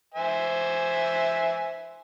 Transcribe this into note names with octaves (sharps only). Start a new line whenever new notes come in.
C5 E5 G#5